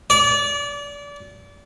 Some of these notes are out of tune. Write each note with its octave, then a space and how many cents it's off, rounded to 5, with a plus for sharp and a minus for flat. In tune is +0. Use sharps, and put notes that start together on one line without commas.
D5 -30